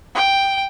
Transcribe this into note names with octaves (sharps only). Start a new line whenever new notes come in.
G5